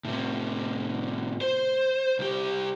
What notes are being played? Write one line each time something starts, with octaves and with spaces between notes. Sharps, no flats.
A2 C3
C5
C2 G4